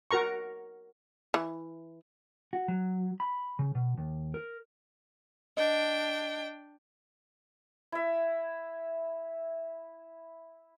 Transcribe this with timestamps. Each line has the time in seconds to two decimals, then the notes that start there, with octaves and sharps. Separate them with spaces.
0.11 F#4 A#4 A#5 C#6
1.34 E3
2.53 F#4
2.68 F#3
3.20 B5
3.59 C#3
3.75 B2
3.98 D#2
4.34 A#4
5.57 D4 D#5 G5
7.92 E4 E5